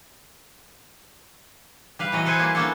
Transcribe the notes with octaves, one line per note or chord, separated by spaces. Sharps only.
G3 B4 F5
E3 F#3 D#5
A4 B4 C5 F#5 G#5
G3 A#3 E4 G#4
A#3 B3 C#4 D4 A4